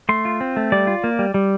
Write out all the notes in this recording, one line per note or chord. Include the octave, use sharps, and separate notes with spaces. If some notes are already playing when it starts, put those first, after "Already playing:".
A3 C6
F4
C4
A3
G3 D5
F4
A#3
G3
G3